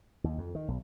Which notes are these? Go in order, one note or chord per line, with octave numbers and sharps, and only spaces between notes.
D#2
F2
D#3
B1